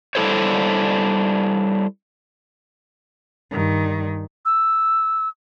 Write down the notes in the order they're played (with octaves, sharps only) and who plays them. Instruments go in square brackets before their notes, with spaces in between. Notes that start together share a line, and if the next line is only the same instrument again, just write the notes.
[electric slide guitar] G3 D4 E4 A4 C5 C#5
[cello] G2 D#3
[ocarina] E6